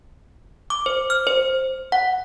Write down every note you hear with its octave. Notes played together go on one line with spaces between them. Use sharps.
D6
C5
F6
C5
F#5